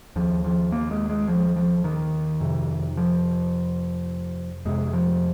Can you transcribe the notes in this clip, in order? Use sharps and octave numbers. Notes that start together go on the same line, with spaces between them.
D#2 F3
F3
A#3
G#3
G#3
F3
F3
D#3
F2 C3
F3
F2 C3 G#3
F3